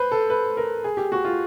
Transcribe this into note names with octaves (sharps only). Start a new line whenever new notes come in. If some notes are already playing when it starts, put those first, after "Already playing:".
Already playing: B4 C5
A4
B4
A#4
G#4
G4
F#4
F4